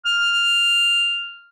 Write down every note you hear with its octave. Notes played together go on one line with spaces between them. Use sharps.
F6